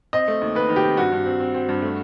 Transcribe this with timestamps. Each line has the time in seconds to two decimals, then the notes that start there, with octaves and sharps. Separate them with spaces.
0.13 C4 D#5
0.28 A3
0.42 D#2
0.55 D#2 B4
0.69 D#3
0.76 G4
0.83 C4
0.97 G2 F#4
1.12 G2
1.26 C4
1.40 C4
1.54 C4
1.69 G2
1.82 A3